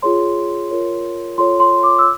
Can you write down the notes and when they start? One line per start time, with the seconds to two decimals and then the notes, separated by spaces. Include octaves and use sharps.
0.02 F4 G#4 C#5 C6
0.71 F4 A#4 C#5
1.38 F4 A4 C#5 C6
1.60 C6
1.83 D6
1.99 E6